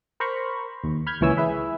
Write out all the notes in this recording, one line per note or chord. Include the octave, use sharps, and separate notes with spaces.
A#4 C5 A#5 B5 C#6
D#2
B5 F6 G6 G#6
C#2 A#2 E3 C#5 G#5 E6
E4 G#4 B4 E5